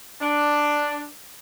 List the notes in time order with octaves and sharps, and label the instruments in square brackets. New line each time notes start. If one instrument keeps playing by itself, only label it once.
[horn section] D4